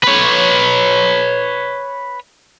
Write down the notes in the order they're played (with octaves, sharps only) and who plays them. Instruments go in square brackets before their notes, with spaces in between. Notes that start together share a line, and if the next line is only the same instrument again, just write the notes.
[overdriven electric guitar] B4 C#5